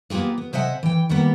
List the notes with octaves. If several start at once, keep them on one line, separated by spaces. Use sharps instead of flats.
A#3 B3 F4 G4 G#4
B3
C3 C5 D#5 E5 F#5 G#5
E3 G5
D#3 G3 A#3 B3